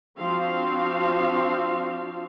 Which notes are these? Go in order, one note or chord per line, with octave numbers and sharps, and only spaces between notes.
F3 C4 D4 F#4 C5 F5